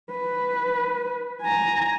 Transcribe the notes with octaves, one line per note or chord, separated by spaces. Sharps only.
B4
G#5 A#5